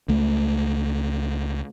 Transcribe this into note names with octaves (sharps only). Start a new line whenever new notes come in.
C#2 A3